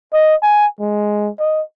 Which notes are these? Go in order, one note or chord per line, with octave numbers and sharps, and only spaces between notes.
D#5
G#5
G#3
D#5